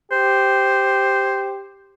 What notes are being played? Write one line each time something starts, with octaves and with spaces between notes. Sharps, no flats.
G4 C5